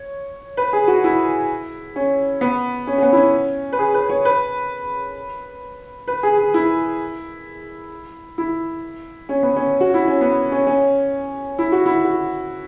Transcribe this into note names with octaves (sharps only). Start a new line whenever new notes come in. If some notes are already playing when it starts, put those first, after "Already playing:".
Already playing: C#5
B4
G#4
F#4
E4
C#4
B3
C#4
C#4
B3
E4
C#4
B4
G#4
B4
C#5
B4
B4
G#4
G#4
E4
E4
C#4
B3
C#4
F#4
E4
C#4
B3
C#4
C#4
E4
F#4
E4
F#4